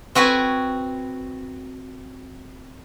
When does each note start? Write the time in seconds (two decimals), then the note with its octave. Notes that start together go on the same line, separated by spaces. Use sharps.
0.15 C4 F#4 B4 G#5